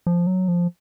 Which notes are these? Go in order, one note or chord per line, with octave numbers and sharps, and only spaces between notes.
F3
F#3
F3